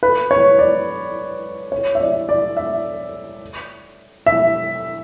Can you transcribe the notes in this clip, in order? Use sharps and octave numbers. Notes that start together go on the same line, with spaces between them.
B4
C#5
D5
C#5
E5
D5
D5
E5
E5